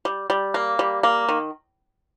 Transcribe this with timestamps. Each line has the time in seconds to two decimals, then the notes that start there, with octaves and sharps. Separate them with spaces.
0.05 G3
0.30 G3
0.54 A#3
0.79 G3
1.03 A#3
1.29 D#3